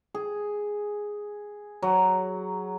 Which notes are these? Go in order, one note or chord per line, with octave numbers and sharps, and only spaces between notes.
G#4
F#3